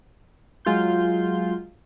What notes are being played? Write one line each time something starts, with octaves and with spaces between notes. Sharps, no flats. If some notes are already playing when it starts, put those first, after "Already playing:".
F#3 G#3 F4 C6 G6